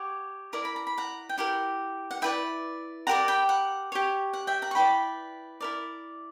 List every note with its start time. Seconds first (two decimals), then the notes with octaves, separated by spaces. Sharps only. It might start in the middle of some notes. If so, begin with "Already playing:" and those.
Already playing: G4 C#5 F#5
0.53 E4 A#4 D5 A#5
0.65 B5
0.76 A#5
0.87 B5
0.98 F#5 A#5
1.29 G5
1.38 E4 G4 A#4 F#5
2.11 F#5
2.22 E4 B4 D5 E5 G5
3.07 G4 A#4 D5 F#5 A#5
3.28 G5 B5
3.49 F#5
3.92 G4 C#5
4.33 F#5
4.47 E5 G5
4.62 F#5 A#5
4.71 C#6
4.75 E4 B4 D5 G5 B5
5.60 E4 A#4 D5